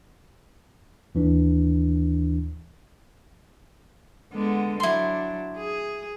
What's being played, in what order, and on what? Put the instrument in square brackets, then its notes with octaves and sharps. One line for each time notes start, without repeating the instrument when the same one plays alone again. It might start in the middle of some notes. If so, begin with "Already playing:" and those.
[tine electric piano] D#2 E3 D4
[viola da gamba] D3 G#3 B3
[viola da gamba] F#3 D4 [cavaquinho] E4 C6
[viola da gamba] G#4